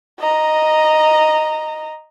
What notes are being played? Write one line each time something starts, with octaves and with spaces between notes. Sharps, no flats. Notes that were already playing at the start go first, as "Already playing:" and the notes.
D#5 A#5